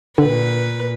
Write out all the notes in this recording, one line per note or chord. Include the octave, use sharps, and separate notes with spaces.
A#2 D3 B4